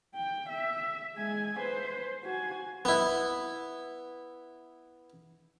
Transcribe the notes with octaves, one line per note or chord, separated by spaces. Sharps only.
G5
E5
G#3 G#5
B4 C5
F#4 G#5
B3 E4